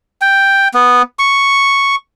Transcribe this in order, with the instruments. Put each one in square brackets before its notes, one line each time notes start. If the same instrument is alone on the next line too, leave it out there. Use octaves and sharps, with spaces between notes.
[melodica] G5
B3
C#6